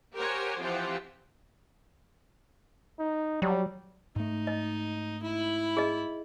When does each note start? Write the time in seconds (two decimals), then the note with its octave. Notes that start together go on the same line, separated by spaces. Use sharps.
0.16 G4 A#4 C5 C#5 F#5 G#5
0.59 E3 F3 C4 F4 G4 F#5
2.99 D#4
3.42 F#3 G3
4.16 G#2 A3 D#4
4.47 D#5
5.23 E4 B5
5.77 G#4 D#5